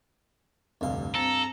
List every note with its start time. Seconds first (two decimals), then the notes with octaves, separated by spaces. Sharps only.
0.81 F1 D2 G2 F5
1.15 C4 A4 A#5